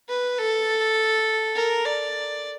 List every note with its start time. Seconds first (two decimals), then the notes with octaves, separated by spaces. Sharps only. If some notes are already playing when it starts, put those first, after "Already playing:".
0.08 B4
0.38 A4
1.56 A#4
1.86 D5